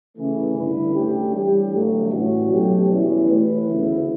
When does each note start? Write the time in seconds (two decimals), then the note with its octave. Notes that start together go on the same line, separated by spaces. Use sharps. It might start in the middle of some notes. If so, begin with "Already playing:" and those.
0.16 C#3 E3 A3
0.55 G2 D3 A3 E4 B4
0.94 D2 D3 A3 C#4 G4
1.32 E3 G3 D4 G4
1.72 G1 G2 F#3 A3
2.11 A2 E3 G3 C#4 F#4
2.50 B2 F#3 A3 C#4 G4
2.88 E2 B2 G3 C#4 E4
3.27 E3 A3 E4 B4
3.66 D2 C#3 E3 B3 E4